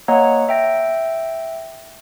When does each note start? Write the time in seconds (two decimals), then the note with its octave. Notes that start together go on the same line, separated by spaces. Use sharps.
0.08 A#3 C#5 D#5 F#5 A#5
0.49 E5 G5 A#6